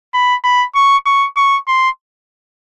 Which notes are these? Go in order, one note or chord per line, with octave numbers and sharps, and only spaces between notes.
B5
B5
C#6
C#6
C#6
C6